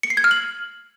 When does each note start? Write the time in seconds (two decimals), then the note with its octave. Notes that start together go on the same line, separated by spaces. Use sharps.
0.03 C#7
0.10 C7
0.17 G#6
0.24 F6
0.31 F#7